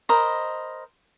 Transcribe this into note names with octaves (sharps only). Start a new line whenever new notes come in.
A#4 C5 D#5 B5